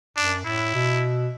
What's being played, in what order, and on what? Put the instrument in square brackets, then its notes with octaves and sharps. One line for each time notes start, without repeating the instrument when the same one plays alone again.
[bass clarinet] F#2 [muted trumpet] D4
[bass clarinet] A2 [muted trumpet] E4
[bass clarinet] B2